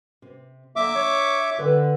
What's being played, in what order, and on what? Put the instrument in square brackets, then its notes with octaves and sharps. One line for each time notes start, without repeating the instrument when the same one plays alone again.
[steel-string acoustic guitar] C3
[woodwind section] D3 F#3 A#3 [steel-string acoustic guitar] D4 [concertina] E5 D6
[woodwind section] C#5
[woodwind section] D3 [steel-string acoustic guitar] B4 G5